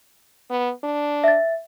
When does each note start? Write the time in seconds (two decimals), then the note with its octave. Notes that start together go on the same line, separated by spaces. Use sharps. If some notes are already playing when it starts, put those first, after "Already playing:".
0.50 B3
0.84 D4
1.24 E5 A6